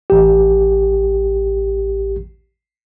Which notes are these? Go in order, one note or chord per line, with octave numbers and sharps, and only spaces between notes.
A1 G4